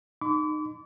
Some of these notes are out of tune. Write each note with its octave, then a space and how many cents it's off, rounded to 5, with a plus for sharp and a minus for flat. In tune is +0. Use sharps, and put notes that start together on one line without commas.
D#4 -25 B5 +45 D6 -35